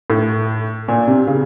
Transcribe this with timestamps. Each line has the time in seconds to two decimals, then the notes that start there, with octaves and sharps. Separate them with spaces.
0.10 A2
0.88 A#2
1.07 C3
1.27 C#3